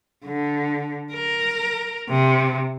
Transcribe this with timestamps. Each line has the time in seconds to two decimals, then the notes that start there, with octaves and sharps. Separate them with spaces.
0.25 D3
1.13 A#4
2.09 C3